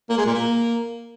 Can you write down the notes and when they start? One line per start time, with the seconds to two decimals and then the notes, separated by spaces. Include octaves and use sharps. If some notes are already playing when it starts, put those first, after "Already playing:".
0.10 A#3
0.18 G#3
0.26 A#2
0.34 A#3